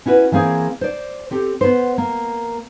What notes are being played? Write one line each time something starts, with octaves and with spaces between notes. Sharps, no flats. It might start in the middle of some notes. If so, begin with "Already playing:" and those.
C#4 E4 F#4 A#4 B4
E3 A#3 C4 G#4 C5
C5 D5
C4 G4 A4
B3 C5
A#3